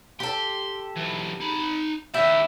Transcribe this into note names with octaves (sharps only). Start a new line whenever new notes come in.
G4 A4 C6
E3 F#3
D#4 B5
D#2 E4 G4 E5